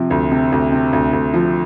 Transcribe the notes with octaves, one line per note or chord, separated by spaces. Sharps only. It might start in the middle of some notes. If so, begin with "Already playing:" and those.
Already playing: C3 F3
D2
C3
D2
C3
D2
D2
F3